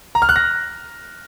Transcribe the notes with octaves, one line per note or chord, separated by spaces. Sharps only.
A#5
F6
F#6
A#6